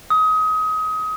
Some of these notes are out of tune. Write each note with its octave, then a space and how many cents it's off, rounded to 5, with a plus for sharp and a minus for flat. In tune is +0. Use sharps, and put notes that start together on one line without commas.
D#6 +25